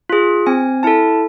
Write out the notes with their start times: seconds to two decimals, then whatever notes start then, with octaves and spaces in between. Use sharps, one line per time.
0.09 F4 G#4
0.47 C4 G#5
0.83 E4 A4 A5